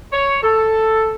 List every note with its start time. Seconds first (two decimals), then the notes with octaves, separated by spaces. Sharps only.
0.13 C#5
0.43 A4